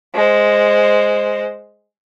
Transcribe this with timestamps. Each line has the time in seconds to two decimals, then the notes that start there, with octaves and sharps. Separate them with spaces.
0.15 G#3 C5